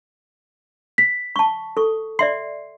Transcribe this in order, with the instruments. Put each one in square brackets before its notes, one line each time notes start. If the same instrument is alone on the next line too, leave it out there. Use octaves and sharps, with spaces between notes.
[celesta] B6
[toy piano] A5 C#6
A4 C#6
[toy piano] D5 E5 C6 [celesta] C7